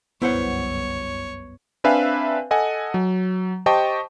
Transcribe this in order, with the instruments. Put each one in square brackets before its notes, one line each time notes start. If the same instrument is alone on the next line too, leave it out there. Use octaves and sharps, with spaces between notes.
[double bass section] G1 C2 F#2 [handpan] B3 [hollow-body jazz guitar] E4 C5 F#5 [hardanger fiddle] C#5
[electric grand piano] C4 D4 B4 E5 F5 G#5
A4 D#5 F#5 G#5
F#3
G4 C5 D#5 G5 A5 C#6